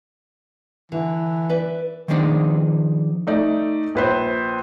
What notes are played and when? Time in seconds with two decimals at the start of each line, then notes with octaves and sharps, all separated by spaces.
0.92 D3 E3
1.49 B4 D5 E5
2.08 D#3 F3 G#3 C4 D4 D#4
3.27 A3 D#4 D5
3.95 A#1 B4 C5